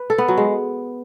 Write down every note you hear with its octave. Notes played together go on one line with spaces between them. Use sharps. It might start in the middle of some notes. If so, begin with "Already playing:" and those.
Already playing: B4
A4
B3
F#3
G#3